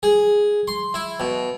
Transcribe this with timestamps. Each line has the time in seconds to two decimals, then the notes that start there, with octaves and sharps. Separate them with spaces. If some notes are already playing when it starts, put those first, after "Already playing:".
0.03 G#4
0.68 C6
0.94 E4
1.20 B2